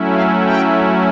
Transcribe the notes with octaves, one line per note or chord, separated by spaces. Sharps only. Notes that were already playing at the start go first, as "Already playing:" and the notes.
Already playing: F#3 A3 C#4 E4
F5
G5